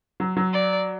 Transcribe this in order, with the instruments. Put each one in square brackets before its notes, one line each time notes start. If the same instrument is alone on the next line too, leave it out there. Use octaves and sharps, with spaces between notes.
[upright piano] F#3
F#3
[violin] D5